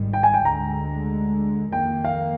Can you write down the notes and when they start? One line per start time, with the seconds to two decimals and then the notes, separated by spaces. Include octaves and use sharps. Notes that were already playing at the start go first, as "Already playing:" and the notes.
Already playing: G#1 G#2 D#3 G3
0.13 G5
0.23 G#5
0.34 G5
0.45 D2 D3 G#3 A#5
1.72 F2 D#3 A#3 G5
2.05 F5